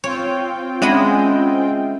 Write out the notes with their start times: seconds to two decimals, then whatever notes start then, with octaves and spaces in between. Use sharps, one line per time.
0.04 C4 F4 C#5 G5
0.82 G#3 C#4 D4 D#5 E5 F#5 B5